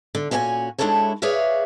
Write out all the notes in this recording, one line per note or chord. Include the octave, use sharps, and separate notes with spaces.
D3
A#2 C#4 F#4 B4 G#5
G#3 D4 E4 F#4 A4 C#5
G#4 B4 C#5 D5 E5 F5